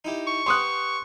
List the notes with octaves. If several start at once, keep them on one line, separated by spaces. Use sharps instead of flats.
D#4 E4 G4
C#6
G4 B4 F#5 C6 D#6 F#6